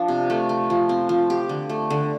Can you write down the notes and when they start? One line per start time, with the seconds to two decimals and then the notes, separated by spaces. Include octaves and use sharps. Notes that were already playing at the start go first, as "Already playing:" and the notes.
Already playing: F3 D4
0.08 C3
0.30 A3
0.49 A3
0.70 F3
0.89 C4
1.09 F3
1.30 G4
1.49 D3
1.69 A3
1.90 D3